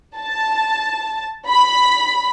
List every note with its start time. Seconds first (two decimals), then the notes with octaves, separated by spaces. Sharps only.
0.16 A5
1.48 B5